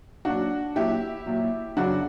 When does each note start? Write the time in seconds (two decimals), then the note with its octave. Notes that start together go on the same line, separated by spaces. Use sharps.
0.25 A#2 F#3 D4 F#4
0.75 A#2 F#3 E4 G4
1.26 A#2 F#3
1.76 F#2 C#3 F#3 D4 F#4